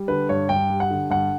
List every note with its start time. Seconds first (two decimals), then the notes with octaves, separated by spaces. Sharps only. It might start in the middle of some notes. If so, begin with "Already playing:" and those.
Already playing: G3
0.08 D3 B4
0.29 G2 C#5
0.49 G2 G5
0.70 G3
0.80 F#5
0.90 D3
1.10 G2 F#5